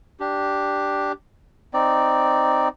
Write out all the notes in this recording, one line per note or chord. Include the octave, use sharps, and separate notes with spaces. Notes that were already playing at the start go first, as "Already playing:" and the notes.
D4 G4
C4 D#4 D5